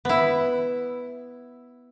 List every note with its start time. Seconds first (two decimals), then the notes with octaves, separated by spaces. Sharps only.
0.05 B3 E4